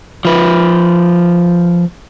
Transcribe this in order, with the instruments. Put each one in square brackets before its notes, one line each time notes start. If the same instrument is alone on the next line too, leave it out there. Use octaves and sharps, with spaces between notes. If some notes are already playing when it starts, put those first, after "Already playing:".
[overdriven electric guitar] F3 B4